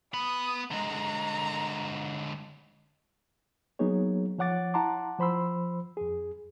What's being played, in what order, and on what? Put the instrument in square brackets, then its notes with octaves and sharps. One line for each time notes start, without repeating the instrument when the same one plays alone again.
[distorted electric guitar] B3 B5 [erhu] D#6
[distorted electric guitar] D3 G#3 [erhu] A#5
[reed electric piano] F#3 A#3 B3 D#4 G#4 C#5
F3 C#5 F#5 D6 A6
E4 F#5 A5 A#5 C6 D6
F3 C5 B5 C6 E6
F2 G#4